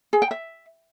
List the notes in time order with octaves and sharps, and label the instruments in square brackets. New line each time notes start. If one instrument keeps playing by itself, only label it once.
[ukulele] G#4
G5
E5